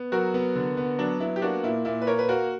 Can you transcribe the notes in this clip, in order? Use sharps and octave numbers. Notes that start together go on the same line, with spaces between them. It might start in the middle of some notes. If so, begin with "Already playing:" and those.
Already playing: B3
F#3 F#4 A#4
B3
D3
B3
F#3 D4
B3 E4
G4
A#3 D4 F#4
A#2 E4
A#2 E4
B4
A#3 A#4 C#5
B4
A#3 F#4 A#4